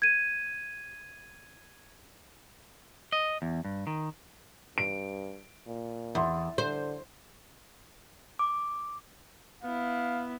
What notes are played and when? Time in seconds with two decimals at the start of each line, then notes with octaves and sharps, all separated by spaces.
0.02 G#6 D#7
3.12 D#5
3.42 E2
3.65 G2
3.87 D#3
4.78 G2 D7
5.67 A#2
6.15 E2 E5 C6
6.58 D3 C5
8.39 D6
9.63 B3 E4 F5